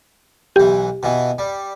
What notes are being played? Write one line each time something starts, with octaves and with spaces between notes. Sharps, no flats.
B1 E3 G4
B2 E3
G3